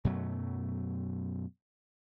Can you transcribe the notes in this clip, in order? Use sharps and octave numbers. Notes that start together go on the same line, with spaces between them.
F#2 B2 F#3 A3